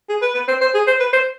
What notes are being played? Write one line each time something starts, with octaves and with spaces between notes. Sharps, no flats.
G#4
B4
B4
C5
C5
G#4
C5
B4
C5